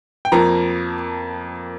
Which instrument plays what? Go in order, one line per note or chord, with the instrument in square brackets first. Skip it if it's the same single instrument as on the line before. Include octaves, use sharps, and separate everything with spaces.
[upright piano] G5
F2 F3 A#3 A#5